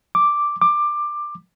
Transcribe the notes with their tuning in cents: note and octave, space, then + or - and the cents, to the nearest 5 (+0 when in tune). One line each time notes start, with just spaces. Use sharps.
D6 +0
D6 +15